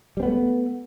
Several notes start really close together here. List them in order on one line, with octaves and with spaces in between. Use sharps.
G3 C4 B3 A3